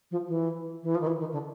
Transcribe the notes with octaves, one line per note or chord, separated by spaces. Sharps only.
F3
E3
E3
F3
D#3
E3
D#3
D3